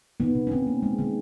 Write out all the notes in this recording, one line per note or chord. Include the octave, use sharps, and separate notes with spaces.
D#3 B3
C3
C#4
D#3 C4
A#3
G#3
D#3